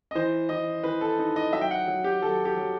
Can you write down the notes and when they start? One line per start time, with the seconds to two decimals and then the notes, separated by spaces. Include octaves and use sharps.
0.11 D#5
0.15 E3 C5
0.49 E3 D#5
0.83 E3 B4
1.01 A4
1.19 D#4
1.36 D#5
1.53 F#3 E5
1.61 G5
1.71 F#5
1.88 F#3
2.04 G4
2.22 F#3 A4
2.45 G4
2.57 F#3